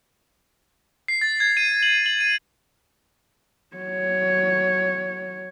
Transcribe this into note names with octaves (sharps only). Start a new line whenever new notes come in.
C7
A6
G#6
D#7
F#7
F#7
D#7
F#3 C#5